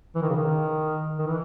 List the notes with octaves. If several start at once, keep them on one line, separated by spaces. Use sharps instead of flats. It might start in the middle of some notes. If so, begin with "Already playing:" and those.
E3
D#3
C#3
D#3
D#3
E3